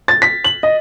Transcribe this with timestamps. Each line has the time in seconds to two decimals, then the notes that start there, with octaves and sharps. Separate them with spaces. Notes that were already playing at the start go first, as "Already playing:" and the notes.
0.08 A6
0.22 B6
0.44 F#7
0.63 D#5